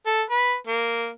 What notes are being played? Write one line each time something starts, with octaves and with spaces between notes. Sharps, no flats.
A4
B4
A#3